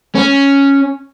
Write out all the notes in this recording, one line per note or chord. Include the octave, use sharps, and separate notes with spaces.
C#4